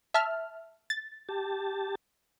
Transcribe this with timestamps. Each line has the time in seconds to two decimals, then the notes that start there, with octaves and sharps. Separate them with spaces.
0.14 E5 A5 F6
0.90 A6
1.29 G4 A5